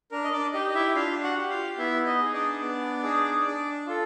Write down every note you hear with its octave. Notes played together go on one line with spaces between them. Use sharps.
D4 A#4
D#5
D4 D5
D#4 G4 D#5
D#5
E4 E5
D4 F4 F5
F#4 F#5
G4
F4 F5
B3 E4 E5
D#4 D#5
D#4 G#4
D4 D5
B3
D#4 G#4
D4
F4 A4